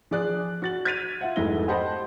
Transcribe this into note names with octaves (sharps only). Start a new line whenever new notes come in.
F3 G#4 D5 F#6
F#4 A6 F#7
G#6 A6 B6 D#7 F7
F4 E5 F#5
F1 F2 G#2 E4 A#6 G7
G4 C5 D#5 F#5 A5 B5